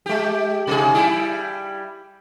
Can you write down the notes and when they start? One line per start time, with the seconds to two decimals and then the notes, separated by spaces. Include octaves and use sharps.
0.06 G#3 G4
0.67 C3 G#4
0.95 G3 E4